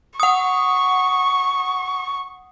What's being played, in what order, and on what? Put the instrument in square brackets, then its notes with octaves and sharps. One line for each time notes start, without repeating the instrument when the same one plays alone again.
[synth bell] F#5 D#6 [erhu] C#6